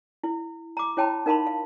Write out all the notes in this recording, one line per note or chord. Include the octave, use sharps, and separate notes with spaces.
E4
A#5 D6
E4 C#5 G5 A5 B5
D#4 A#4 F5 A5 B5 C6
F5